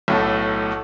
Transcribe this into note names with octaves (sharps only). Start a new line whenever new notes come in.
B1 A2 A3